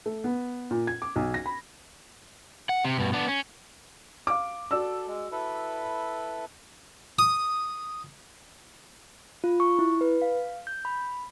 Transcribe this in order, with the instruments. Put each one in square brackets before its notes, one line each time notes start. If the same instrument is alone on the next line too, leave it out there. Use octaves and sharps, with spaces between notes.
[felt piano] A3
B3
A#2
G#6
D6
B1
A#6
B5
[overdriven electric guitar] F#5
C3
G2 B2
B3 D4
C#4
[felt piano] F5 D6
[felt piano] F#4 D5 E6 [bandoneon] A4
[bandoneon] G#3
E4 A4 B4
[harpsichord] D#6
[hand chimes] F4
C#6
E4
B4
F5
G6
B5